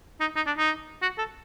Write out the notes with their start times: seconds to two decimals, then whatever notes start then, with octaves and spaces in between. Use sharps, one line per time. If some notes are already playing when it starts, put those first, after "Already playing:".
0.20 D#4
0.36 D#4
0.46 D4
0.57 D#4
1.02 F#4
1.18 A4